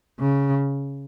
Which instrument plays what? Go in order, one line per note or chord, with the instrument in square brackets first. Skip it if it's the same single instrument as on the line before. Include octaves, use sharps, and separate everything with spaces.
[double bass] C#3